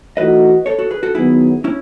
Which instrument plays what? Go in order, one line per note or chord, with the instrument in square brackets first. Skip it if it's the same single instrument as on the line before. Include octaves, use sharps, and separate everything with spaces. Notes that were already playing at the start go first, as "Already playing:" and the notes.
[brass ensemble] E3 A3 D#4 F#4 [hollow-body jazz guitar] B4 D#5
[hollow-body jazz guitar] A4 C#5
F#4 A4
G#4 B4
F#4 A4
[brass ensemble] D#3 F#3 B3 [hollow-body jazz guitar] E4 G#4
[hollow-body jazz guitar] C#4 E4